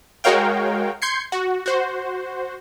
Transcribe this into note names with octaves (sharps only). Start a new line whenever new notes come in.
G#3 F#4 A#4 C#5 F5 G5
C6 G6 G#6 C7 C#7
F#4
F#4 C5